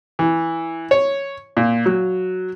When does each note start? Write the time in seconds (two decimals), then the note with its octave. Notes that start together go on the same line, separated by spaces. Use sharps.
0.19 E3
0.91 C#5
1.57 A#2
1.86 F#3